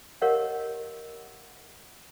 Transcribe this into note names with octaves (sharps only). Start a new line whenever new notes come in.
G4 A#4 C#5 D#5 F5 F#5